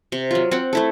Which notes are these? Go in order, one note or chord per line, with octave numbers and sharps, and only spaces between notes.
C3
F#3 F4
C4 F#5
A3 E4 A4